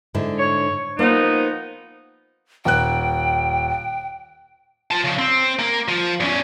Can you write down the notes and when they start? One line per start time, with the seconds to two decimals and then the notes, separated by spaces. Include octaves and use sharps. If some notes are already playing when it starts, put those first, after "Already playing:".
0.14 G#2 D3 E4
0.39 C#5
0.99 F3 A#3 B3 D#4 C5
2.65 D#1 G5 F#6
4.91 F4 A5
5.04 C#3 F3
5.19 C4
5.59 A#3
5.88 F3
6.20 E2 C#4